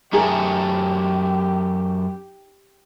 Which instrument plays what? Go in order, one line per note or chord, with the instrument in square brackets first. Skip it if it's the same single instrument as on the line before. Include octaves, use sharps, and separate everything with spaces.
[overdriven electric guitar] F#2 A3 [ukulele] D#4 G#4 A#4 [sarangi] G4